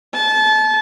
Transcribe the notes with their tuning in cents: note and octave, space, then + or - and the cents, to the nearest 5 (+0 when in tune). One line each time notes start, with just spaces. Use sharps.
A5 -25